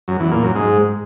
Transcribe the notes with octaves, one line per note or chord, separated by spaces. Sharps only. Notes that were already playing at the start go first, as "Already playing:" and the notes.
F#2
E2
A#2
F#2
G#2